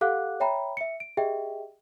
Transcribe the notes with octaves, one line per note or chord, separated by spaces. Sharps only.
G4 A4 F5 F#5 D6 F#6
C#5 E5 G5 A#5 B5
E5 C#7
D7
G4 G#4 D#5 E5 G5